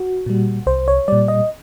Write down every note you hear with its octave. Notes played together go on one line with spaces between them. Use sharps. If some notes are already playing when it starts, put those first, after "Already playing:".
Already playing: F#4
A#2 G3
C2 C5
C#5
A#2 G3 D5
D#5